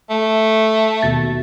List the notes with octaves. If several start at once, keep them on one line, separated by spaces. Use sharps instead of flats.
A3
D#2 B2 A6